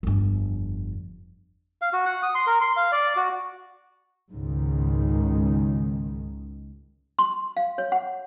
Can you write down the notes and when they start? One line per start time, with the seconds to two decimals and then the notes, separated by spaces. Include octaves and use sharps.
0.03 G1 F2
1.81 F5
1.93 F#4
2.06 F#5
2.23 D#6
2.35 C6
2.47 A#4
2.61 C6
2.77 F5
2.92 D5
3.17 F#4
4.32 C#2 G#2 D#3
7.19 C6
7.57 F5
7.78 C#5
7.92 F#5